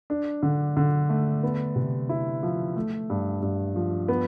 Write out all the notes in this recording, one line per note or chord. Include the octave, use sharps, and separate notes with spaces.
D4
D3
D3
A3
B3
C3
E4
F3
A3
G2
G2
F3
B3